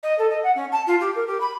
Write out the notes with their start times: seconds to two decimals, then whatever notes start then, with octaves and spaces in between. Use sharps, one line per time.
0.03 D#5
0.19 A4
0.30 D#5
0.43 F#5
0.55 C#4
0.72 A5
0.87 F4
1.01 G4
1.15 A#4
1.27 G4
1.40 B5